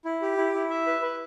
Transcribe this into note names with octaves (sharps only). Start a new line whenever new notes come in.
E4
G4
E4
E4
E5
B4
B4